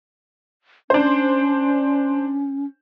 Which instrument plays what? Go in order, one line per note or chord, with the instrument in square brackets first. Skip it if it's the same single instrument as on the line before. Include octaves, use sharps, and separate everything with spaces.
[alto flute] C#4 [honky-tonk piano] D4 C5